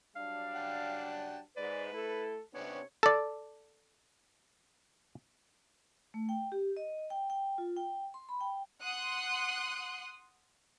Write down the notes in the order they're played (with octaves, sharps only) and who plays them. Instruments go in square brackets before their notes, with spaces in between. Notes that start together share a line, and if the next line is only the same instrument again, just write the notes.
[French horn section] F#3 G3 D4 [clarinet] F5
[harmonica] F#5 G5 A5
[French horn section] G#2 [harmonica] B4 [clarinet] D5
[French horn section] A3 A4 [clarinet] E4
[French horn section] C3 [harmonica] B3 C#4 D4 [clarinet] C#5
[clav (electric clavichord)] A4 D5
[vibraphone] A3
G5
G4
D#5
G5
G5
F4
G5
C6
B5
G5
[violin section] F#5 C6 D#6 F#6